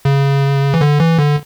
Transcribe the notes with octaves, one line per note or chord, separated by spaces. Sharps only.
C#3
E3
D3
E3
D3